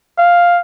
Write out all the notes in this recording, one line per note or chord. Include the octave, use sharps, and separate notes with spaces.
F5